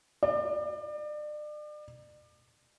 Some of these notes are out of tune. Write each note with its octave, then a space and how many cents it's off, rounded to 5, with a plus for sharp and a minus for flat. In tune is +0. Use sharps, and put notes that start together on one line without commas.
D5 +35